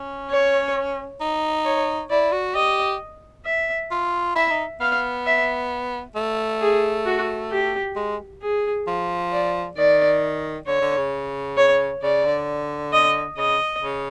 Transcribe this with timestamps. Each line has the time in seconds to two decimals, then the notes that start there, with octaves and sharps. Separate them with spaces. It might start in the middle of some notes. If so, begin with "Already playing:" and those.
Already playing: C#4
0.30 C#5
1.21 D#4
1.65 C#5
2.10 E4 D5
2.32 F#4
2.55 G4 D#5
3.45 E5
3.91 F4
4.36 E4 E5
4.51 D#4
4.81 B3 F5
5.26 E5
6.16 A3
6.61 G#4
7.06 F#4
7.51 G4
7.96 G#3
8.42 G#4
8.87 F3
9.32 D5
9.77 D#3 D5
10.67 D3 C#5
10.82 D3
10.97 C#3
11.57 C#5
12.03 C#3 D5
12.25 D3
12.93 D#5
13.37 C#3 D#5
13.82 C#3